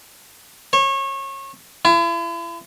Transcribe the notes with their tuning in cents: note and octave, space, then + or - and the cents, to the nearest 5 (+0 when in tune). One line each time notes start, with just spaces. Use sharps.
C#5 -30
E4 +40